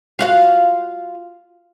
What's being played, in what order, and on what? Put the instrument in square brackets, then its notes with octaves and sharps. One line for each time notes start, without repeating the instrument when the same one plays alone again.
[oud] F4 F#4 F5